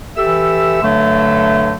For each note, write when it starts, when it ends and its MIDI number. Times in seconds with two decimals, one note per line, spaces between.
0.17 0.78 52
0.17 0.78 67
0.17 0.78 69
0.17 0.78 76
0.17 0.78 88
0.82 1.75 43
0.82 1.75 50
0.82 1.75 54
0.82 1.75 57